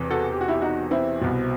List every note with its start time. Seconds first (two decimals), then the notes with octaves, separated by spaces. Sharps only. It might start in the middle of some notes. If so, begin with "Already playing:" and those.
Already playing: E1 E2 C3 E3
0.10 F#4 A4
0.32 G4
0.41 F#4
0.48 E4 G4
0.61 D#4 F#4
0.91 C4 E4
1.21 C2 B2